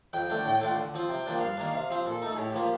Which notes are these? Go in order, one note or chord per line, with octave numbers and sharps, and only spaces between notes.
F2 G5
D3 A3 D4
A2
A3 D4 F4
D3
F3 C4 F4
C3 G5
F3 A#3 D4
G2 F5
D#3 A#3 D4
C3
F3 C4
A#2 A4
A3 D#4
A2 G4
F3 A#3 F4